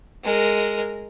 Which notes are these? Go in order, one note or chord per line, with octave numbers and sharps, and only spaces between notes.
G#3 A#4